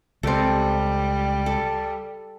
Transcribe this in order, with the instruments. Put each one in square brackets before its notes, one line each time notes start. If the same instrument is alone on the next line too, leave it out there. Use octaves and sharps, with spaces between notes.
[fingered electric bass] C#2 [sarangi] G3 [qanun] C4 G4 A4
[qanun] A4